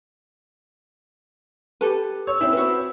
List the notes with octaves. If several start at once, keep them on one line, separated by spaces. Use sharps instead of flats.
G4 A4 B4
C#5 E6
C4 C#4 E4
F#4 B4